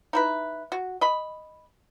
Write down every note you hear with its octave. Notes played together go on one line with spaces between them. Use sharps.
D#4 E4 B4
F#4
D#5 B5